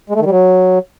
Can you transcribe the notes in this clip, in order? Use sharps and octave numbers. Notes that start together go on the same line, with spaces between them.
G#3
A3
D#3
G3
F#3